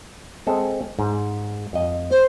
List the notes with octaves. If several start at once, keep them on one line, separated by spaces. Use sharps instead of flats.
G#3 C4 A4
G#2
F2 D#5
C5